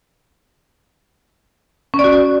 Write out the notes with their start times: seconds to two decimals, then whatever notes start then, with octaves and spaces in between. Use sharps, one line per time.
1.94 C#4
1.99 D5
2.04 F#4